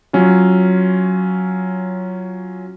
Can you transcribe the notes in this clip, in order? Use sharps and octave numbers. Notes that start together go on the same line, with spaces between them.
F#3 C#4 F4